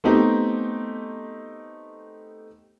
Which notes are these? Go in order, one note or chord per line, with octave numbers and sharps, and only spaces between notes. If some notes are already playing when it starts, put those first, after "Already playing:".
A3 B3 C4 D#4 G4